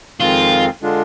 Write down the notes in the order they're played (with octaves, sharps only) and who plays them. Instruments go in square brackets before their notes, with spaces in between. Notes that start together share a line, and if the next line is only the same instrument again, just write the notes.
[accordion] F2 D#3 G#3 C4 [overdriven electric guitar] F4
[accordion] D3 G#3 D4 F4